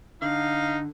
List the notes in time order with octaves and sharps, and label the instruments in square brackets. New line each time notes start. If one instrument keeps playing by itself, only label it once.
[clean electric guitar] D3 [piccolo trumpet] D#4 [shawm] F5